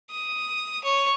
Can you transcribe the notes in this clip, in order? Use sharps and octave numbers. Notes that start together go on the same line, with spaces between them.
D#6
C#5